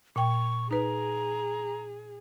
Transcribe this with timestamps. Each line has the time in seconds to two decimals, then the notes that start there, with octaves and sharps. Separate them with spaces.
0.16 A#2 G5 C#6
0.71 D#4 G#4 B4 A#5